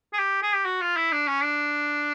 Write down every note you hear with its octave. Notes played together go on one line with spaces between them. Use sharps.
G#4
G4
G#4
G4
F#4
F4
E4
D4
C#4
D4